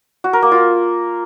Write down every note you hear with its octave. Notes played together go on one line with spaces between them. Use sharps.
F#4
A#4
A#3
F4